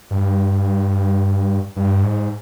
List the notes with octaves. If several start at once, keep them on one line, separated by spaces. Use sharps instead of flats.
G2
G2
G#2